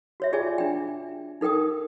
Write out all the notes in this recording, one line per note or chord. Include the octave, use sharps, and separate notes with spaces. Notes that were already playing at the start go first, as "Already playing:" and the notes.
F#4 C#5 E5
F4 G#4 D5 E5 G5 G#5
D4 G5
D#4 A4 A#4 G5 D#6